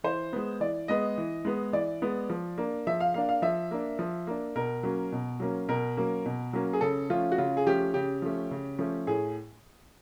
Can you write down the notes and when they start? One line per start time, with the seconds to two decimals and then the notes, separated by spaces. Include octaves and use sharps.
0.04 E3 C5
0.33 G#3 B3
0.60 E3 D5
0.88 G#3 B3 D#5
1.18 E3
1.45 G#3 B3
1.73 E3 D5
2.02 G#3 B3
2.30 F3
2.58 A#3 D4
2.87 F3 E5
3.00 F5
3.14 A#3 D4 F5
3.29 F5
3.42 F3 E5
3.71 A#3 D4
3.99 F3
4.27 A#3 D4
4.56 B2 A#4
4.83 F#3 A#3 C#4
5.12 B2
5.40 F#3 A#3 C#4
5.69 B2 A#4
5.97 F#3 A#3 C#4
6.26 B2
6.53 F#3 A#3 C#4
6.73 G#4
6.81 C#3 A4
7.09 F3 A3 C#4 F4
7.32 F#4
7.38 C#3 F4
7.57 G#4
7.67 F3 A3 C#4 G4
7.94 C#3 G4
8.22 F3 A3 C#4
8.51 C#3
8.79 F3 A3 C#4
9.07 A2 G#4